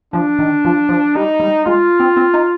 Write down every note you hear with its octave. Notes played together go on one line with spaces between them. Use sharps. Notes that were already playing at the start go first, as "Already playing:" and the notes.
F3 D4
D#3
F3
F3
G3 D#4
G3
G#3 F4
C4
C4
D#4